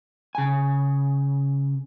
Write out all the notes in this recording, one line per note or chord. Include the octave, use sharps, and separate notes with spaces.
C#3 G#5